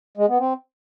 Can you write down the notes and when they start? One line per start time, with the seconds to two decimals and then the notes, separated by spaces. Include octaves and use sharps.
0.17 G#3
0.28 B3
0.39 C4